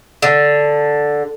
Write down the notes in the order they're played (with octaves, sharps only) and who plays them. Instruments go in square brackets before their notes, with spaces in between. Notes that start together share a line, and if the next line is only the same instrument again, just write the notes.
[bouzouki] D3